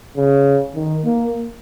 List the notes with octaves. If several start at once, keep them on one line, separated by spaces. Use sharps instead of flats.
C#3
D#3
A#3